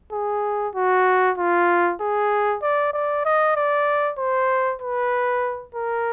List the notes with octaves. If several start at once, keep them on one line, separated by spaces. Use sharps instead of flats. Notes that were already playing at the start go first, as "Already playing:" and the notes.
G#4
F#4
F4
G#4
D5
D5
D#5
D5
C5
B4
A#4